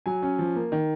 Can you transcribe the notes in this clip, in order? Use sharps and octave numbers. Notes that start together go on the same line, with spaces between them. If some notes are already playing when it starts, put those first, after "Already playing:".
F#3 G#5
C#4
F3
A#3
D#3